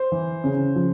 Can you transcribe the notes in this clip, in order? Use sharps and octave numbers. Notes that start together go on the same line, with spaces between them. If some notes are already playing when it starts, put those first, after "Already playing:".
Already playing: C5
E3
C#3
F3